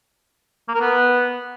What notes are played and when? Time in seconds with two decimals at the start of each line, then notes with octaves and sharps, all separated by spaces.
0.68 A#3
0.75 A#4
0.81 B3